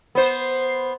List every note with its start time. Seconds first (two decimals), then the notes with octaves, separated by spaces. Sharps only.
0.15 B3 C5